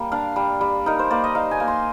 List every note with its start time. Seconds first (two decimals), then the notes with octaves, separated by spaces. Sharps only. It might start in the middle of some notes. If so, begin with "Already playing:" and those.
Already playing: G3 A#3
0.12 D4 F5
0.36 G3
0.61 G3
0.86 D#4 A#4
0.99 C5
1.10 A#3 D5
1.24 D#5
1.35 D#4 F5
1.51 G#5
1.60 A#3
1.68 C6